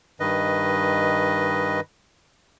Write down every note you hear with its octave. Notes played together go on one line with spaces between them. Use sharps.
G2 D#3 B4 D#5